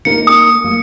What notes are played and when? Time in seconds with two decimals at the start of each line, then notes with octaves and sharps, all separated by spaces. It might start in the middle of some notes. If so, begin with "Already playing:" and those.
0.05 A#3 D#4 A#4 C#7
0.27 D#6
0.64 A#3